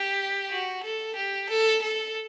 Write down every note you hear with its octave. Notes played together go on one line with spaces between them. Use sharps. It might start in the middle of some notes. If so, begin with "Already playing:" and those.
Already playing: G4
F#4
A4
G4
A4
A4